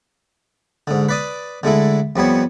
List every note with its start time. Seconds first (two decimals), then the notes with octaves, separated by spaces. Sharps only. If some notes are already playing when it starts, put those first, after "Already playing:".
0.87 G#2 D3
1.09 B4 D5 D#6
1.63 D3 G#3 A3 E4
2.16 F2 G3 B3 C#5